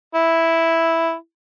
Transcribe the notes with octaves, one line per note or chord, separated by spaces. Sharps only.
E4